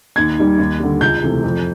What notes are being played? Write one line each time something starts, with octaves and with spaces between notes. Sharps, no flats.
D#2 G#6
D#3 G3
D#2
D3 G3
C#2 G6
C3 E3 A3
F2